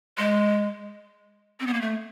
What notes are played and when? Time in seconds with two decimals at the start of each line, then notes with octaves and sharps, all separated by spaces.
0.18 G#3
1.60 C4
1.67 B3
1.74 A#3
1.81 A3